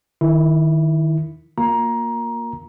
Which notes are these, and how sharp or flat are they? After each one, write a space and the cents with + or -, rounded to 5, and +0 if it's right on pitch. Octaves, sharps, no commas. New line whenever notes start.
D#3 +0 E4 +0
A#3 +0 F4 +20 A#5 +15